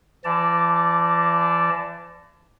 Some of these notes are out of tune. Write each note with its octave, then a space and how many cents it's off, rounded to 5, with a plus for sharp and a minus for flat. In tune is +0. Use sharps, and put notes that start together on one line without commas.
E3 +45 D5 -5 A5 +0